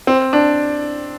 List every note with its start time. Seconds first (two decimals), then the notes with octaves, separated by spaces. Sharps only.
0.07 C4
0.33 D4